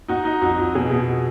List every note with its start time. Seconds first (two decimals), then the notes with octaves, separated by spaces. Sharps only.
0.08 D#4 F#4
0.25 D#4
0.41 F2 F#4
0.58 F2
0.75 B2 G#4
0.91 B2